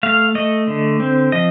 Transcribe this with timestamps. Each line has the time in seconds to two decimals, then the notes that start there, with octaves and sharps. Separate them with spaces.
0.03 A3 F5
0.35 A3 D#5
0.67 D3
1.00 C4
1.32 F3 D#5